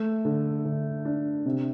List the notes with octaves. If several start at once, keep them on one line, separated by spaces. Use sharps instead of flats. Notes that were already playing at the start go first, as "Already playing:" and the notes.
Already playing: A3
D3
D3
D4
C3